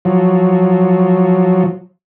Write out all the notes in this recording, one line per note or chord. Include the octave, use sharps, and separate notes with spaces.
F3 F#3